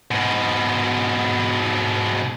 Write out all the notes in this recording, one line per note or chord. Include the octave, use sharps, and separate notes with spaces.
G#2 B2